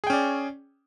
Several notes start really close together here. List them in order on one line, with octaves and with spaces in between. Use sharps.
G#4 G5 C#4 D5